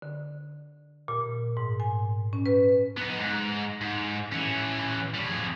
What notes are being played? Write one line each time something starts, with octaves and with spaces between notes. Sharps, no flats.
D3
A#2
G#2
G#5
C#4
B4
B3 D#4
G#2
G#2
E3 C#4
A2 G3
F2 G#4